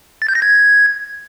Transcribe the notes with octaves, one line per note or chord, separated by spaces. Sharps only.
A6
G6
A#6
G#6